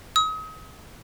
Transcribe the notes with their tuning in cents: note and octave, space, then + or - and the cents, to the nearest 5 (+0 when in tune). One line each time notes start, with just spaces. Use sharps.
D#6 +35